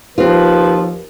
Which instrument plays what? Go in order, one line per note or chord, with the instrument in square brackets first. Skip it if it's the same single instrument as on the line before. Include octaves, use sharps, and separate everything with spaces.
[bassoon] D#2 [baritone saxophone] F3 [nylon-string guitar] C4 F4 [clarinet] B4